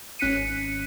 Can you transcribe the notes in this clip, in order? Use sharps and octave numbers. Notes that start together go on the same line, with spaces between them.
G#1 C#4 F#6 B6 C#7 D#7